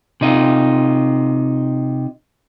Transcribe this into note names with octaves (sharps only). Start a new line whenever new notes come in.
C3 D#4 F4